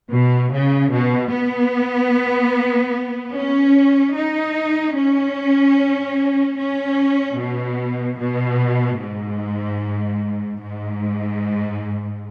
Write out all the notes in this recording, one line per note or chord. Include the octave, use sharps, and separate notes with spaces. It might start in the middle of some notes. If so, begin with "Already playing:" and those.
B2
C#3
B2
B3
C#4
D#4
C#4
C#4
B2
B2
G#2
G#2